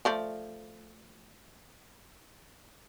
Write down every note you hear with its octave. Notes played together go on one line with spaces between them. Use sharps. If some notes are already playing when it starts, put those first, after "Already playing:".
F3 A3 D5